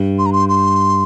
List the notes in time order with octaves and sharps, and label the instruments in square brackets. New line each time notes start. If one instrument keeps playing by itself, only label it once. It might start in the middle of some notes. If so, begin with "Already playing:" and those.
Already playing: [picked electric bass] G2
[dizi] C6
A#5
C6
C6